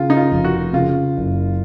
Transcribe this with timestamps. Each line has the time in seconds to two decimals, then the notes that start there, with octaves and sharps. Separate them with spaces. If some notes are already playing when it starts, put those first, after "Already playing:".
Already playing: C#3 F4
0.10 D#4
0.17 F4
0.31 F1
0.44 F#4
0.73 C#3 F4
1.17 F#1